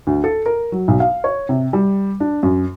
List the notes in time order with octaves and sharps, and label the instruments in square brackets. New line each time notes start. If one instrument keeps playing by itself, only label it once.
[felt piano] D2
A4
A#4
F#3
B1
F5
C#5
C3
G3
D4
F#2